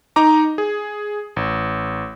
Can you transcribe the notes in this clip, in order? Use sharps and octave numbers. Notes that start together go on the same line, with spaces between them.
D#4 A#5 D6
G#4
A1